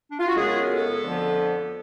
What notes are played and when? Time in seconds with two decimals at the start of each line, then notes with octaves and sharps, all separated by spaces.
0.11 D4
0.19 F4
0.28 F#4
0.36 F#2 C#3 G#3 B3 G#4
0.69 A4
1.02 F2 D3 F3 B3